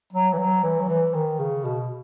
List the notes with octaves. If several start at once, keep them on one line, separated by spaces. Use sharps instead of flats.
F#3
E3
F#3
E3
F#3
E3
D#3
C#3
B2